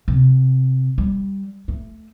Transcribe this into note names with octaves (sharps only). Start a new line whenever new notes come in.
C3
G3
A3